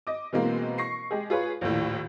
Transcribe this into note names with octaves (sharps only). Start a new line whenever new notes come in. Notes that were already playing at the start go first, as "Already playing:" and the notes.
D#5 D6
B2 E3 G#3 A#3 C4
C#6 A#6 C7
G#3 G4 G#4
F4 G#4 B4 C#5
A#1 D#2 A2